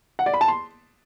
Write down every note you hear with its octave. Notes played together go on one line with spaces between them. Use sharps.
F#5
D5
B5
A5
C6